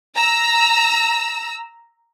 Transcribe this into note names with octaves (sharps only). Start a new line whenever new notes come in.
A#5 E6